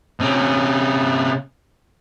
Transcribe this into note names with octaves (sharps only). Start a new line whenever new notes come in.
C3 C#4